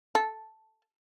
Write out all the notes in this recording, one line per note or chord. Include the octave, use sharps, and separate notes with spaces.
A4